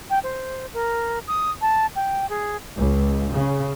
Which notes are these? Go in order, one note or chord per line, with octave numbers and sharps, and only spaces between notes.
G5
C5
A#4
D#6
A5
G5
G#4
C#2
C#3